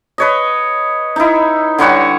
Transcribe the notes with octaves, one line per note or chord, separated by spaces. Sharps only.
B4 C#5 D#5
D#4 E4
D3 G3 C#5 F#5